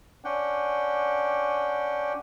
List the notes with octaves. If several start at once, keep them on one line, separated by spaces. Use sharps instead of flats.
C#4 D4 F#5 G5